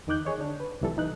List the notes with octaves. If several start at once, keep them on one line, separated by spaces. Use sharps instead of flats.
E2 D#3 D#4 D6 F#6 G6
G#4 C#5 D#5
D3 D4
B4
C2 A#2 E3 G3 A4
E3 D#4 F#6